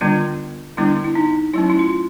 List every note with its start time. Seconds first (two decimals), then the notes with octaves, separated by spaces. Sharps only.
0.01 D3 G3 B3 D4 F4
0.77 D3 G3 B3 D4 E4
1.04 E4
1.15 D#4
1.54 F#3 A3 C#4 E4
1.70 E4
1.79 F4